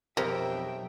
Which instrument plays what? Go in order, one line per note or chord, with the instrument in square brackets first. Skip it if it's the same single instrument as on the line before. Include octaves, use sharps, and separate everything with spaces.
[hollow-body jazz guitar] B1 G4 [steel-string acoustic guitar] F2 [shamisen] A#4 C5 [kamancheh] E5 G5